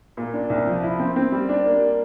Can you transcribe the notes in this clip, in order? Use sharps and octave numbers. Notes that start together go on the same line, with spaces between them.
A#2
D4
C2
F3
E4
C4
C4
G3
D4
A#3